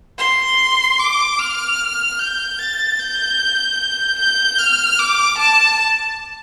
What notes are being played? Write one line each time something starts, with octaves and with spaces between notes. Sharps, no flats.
C6
D6
F6
G6
A6
G6
G6
F6
D6
A5